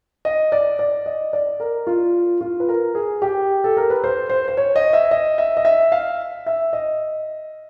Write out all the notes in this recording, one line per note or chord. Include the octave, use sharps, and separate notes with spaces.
D#5
D5
D5
D#5
D5
A#4
F4
F4
B4
A#4
G#4
G4
A4
A#4
B4
C5
C5
C5
C#5
D#5
E5
D#5
E5
D#5
E5
F5
E5
D#5